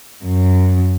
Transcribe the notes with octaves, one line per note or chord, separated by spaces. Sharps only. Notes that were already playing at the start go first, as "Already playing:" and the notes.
F#2